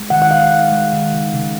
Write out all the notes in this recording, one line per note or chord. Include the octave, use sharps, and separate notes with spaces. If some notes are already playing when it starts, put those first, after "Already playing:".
Already playing: G#3
D#3 F#5
F#5
D#3 F5
G#3
G#3
D#3
C#3
C#3